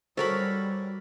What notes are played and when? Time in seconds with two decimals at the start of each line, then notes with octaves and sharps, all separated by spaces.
0.17 G3 C#4 F#4 A4 A#4 C5 B5 C#6